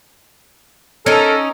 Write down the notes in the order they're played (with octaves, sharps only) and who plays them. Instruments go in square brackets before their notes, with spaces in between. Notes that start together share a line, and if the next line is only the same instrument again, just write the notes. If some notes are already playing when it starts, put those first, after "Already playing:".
[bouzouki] C#4 D#4 [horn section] A4 A#4